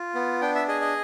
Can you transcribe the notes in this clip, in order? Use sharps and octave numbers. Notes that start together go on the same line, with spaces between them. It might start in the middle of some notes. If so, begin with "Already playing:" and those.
Already playing: F4
B3
D4 G5
E5
G#4 D#5
D#5